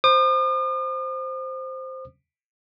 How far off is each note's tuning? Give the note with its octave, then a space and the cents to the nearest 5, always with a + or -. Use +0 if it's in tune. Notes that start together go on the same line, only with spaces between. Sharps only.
C5 +0 D#6 -45